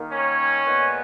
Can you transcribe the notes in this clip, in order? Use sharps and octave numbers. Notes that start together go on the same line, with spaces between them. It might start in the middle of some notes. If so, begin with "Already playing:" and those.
Already playing: D#3 A#3
C#4 C#5
A#2 G#3 B3